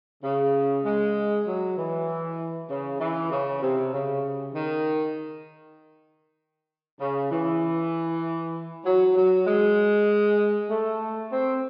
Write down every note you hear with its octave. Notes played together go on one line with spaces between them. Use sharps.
C#3
G#3
F#3
E3
C#3
E3
C#3
C3
C#3
D#3
C#3
E3
F#3
F#3
G#3
A3
C4